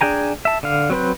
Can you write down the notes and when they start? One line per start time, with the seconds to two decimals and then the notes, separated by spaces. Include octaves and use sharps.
0.01 D4 G#4 G5 G#5 A#5
0.45 E5 A5
0.63 D3 F5
0.90 F#3 C4 B4 C5